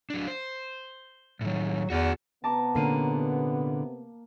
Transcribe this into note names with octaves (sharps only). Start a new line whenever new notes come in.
F#3 D4
C5
A2 D#3 F#3
E2 F#4 D5
C3 B3 A5 A#5 D6
A#2 D3 A#3 C#4 C7 D#7